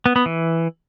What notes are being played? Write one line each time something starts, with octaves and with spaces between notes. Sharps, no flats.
B3
B3
E3